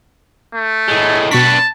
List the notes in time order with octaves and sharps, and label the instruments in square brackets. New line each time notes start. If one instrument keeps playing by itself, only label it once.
[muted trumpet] A3
[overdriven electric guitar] A2 G#3
[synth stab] B2 C#6 B6 [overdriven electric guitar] D4 B4 [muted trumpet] A5